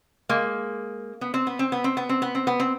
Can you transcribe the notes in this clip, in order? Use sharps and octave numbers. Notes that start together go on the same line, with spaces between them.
G#3 A#3
B3
C4
B3
C4
B3
C4
B3
C4
B3
C4
B3
C4